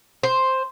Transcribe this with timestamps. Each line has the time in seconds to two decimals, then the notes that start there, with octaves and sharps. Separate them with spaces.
0.23 C5